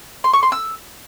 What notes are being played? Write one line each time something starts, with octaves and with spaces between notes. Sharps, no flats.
C6
C#6
C6
E6